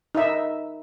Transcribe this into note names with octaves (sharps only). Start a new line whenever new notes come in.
D#4 E5